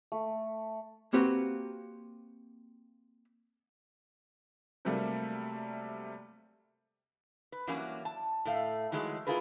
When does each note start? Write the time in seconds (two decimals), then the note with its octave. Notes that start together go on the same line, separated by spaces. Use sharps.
0.12 A3
1.13 A#3 C4 F#4 G4 B4
4.85 C3 F#3 G3 A3 A#3
7.52 B4
7.67 E3 F#3 G3 A#3 C#4
8.05 A5
8.45 A2 A3 F5
8.92 D#3 E3 F#3 G#3 A3
9.27 A#3 E4 F4 G#4 A#4 B4